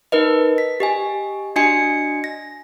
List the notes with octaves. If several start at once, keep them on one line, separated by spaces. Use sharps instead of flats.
D#4 A#4 B4 D#5
B6
G4 D#5 G#5
D4 F#4 D#5 G#5 C#7
A#6